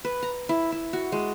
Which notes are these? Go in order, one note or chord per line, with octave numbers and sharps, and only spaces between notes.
B4
A#5
E4
E4
F#4
G#3